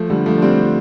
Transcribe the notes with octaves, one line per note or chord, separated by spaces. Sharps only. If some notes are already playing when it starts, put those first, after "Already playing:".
Already playing: F3 A3
D3 G3
F3 A3
D4
G3 C4